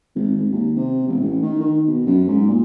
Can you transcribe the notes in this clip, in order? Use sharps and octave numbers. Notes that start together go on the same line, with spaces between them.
G#1
G#1
D#2
C3
E1
A1
D#3
D#3
B2
F#2
G#2
A#2